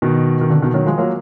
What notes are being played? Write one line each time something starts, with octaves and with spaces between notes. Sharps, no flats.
B2 D#3
D#3
D3
B2 D#3
D#3 F#3
F3 G#3
F#3 A#3